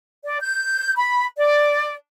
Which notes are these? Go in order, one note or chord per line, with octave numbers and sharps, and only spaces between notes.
D5
G6
B5
D5